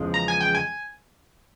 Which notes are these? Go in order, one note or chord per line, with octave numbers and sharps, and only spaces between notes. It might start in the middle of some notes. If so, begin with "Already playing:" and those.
Already playing: E2 C#3 F3 G#3
A#5
G#5
G5
G#5